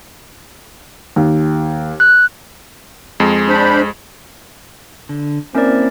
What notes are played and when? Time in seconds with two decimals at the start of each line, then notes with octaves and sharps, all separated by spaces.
1.16 D#2
2.00 F#6
3.20 F2 G#3
3.49 D4 C5 B5
5.09 D3
5.55 A#3 C4 C#4 E4 A#4 D5